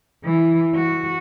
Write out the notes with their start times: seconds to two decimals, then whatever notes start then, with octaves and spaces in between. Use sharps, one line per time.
0.25 E3
0.75 F#4